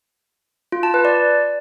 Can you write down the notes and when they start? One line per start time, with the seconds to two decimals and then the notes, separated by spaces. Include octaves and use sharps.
0.72 F4
0.83 A5
0.94 B4
1.05 D5